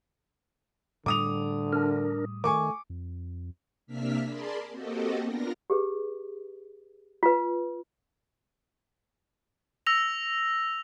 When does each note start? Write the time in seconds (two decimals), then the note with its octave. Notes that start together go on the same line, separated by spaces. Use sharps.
1.06 A2 D3 G3 D6 D#6 F7
1.73 D4 A#4
2.44 D#3 A3 G#5 C#6 D6
2.90 F2
3.87 C3 A#3 D4 E5 F6 B6
4.24 G#4 A#4 D5 A5 B5 C6
4.69 A#3 C4 F#4 G4 A4 D#5
5.21 B3 D4 F4 A#4 A#6
5.70 G4 G#4 B4
7.23 F4 B4
9.87 E6 A#6 F7